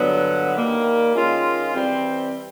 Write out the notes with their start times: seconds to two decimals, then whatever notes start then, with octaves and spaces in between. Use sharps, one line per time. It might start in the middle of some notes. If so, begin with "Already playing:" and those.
Already playing: G2 D3 F#3 B3
0.52 D#3 G3 A#3
1.13 D#3 G#3 C#4 F4
1.73 E3 G3 C4